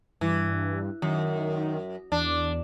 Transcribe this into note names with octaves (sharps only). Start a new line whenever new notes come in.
G2 E3
F#2 D#3
E2 D4